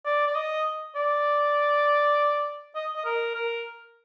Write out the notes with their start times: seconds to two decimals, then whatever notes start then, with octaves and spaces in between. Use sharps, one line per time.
0.05 D5
0.27 D5
0.35 D#5
0.96 D5
2.76 D#5
2.95 D#5
3.05 A#4
3.35 A#4